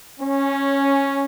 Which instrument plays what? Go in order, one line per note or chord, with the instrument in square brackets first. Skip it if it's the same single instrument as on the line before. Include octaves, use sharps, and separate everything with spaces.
[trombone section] C#4